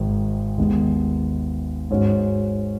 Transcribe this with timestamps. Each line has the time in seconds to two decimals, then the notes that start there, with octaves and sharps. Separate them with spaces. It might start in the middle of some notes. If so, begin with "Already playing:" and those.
Already playing: G#1 D#3 G#3
0.58 D#2 D#3 G#3 B3
1.90 G#2 G#3 C#4 F#4